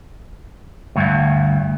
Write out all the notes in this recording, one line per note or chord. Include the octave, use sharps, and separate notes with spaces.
D2 G2